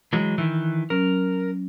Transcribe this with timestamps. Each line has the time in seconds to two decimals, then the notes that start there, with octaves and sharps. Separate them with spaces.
0.13 E3 F#3 G#3
0.38 D#3 E3
0.90 F#3 C#4 A#4